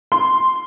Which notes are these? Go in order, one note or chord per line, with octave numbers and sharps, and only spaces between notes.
C6